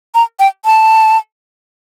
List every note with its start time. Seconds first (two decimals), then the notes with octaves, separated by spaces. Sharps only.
0.14 A#5
0.39 G5
0.65 A5